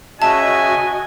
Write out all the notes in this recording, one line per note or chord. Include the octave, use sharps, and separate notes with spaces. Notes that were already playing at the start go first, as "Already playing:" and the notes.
C#3 F#4 D#5 E5 G#5 A5